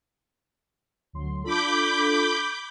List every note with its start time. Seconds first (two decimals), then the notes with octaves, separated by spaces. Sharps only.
1.13 D2 F#3 C6
1.44 D4 F4 A4 B5 D6 G6